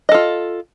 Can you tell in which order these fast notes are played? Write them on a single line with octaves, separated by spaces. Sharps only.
D#5 A4 F4